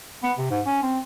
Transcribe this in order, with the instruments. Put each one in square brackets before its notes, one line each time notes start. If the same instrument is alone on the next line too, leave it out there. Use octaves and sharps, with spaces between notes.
[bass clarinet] B3
C3
G#2
C#4
C4